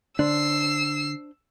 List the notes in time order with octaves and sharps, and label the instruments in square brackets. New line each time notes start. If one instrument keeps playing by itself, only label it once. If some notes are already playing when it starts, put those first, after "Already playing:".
[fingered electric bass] D3 [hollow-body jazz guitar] D4 C5 [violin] E6 C7